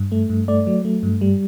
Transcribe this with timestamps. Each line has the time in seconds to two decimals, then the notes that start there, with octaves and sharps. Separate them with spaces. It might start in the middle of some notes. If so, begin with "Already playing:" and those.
Already playing: G2
0.12 A3
0.30 G2
0.48 A3 D5
0.67 F#3
0.85 A3
1.03 G2
1.21 G3